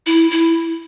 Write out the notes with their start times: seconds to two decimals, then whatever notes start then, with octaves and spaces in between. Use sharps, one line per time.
0.06 E4
0.31 E4